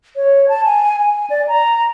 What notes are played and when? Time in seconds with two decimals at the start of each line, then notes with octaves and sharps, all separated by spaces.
0.16 C#5
0.49 A5
0.65 G#5
0.99 G#5
1.30 D5
1.48 A#5